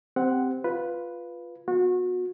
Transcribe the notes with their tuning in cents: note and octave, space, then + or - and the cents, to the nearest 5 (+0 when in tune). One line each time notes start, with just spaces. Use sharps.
C4 -10 G4 +0 F#5 +0
F4 +0 B4 +0
B3 +0 F#4 -30